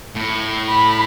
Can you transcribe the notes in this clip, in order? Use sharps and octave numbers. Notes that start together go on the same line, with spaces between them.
A2
B5